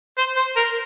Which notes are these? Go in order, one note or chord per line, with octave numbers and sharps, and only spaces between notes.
C5
C5
A#4